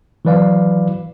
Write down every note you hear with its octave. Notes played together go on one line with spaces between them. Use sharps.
E3 F#3 B4 D5 F5